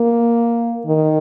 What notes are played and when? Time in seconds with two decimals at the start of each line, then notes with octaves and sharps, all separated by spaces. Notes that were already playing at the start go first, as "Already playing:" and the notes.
Already playing: A#3
0.86 D#3